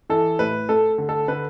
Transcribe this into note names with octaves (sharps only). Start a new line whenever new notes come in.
E3 A4
A2 B4
A3 A4
D3
A4
D3 B4